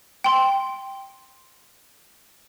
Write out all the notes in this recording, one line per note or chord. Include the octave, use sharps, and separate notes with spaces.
G5 C6